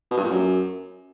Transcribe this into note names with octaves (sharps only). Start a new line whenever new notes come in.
B2
G2
A#2
F#2